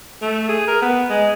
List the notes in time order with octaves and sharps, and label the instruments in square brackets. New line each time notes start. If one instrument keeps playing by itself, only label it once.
[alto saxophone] A3
G#4
A#4
B3
G#3